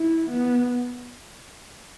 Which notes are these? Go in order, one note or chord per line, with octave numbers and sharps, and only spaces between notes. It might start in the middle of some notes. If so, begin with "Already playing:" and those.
Already playing: E4
B3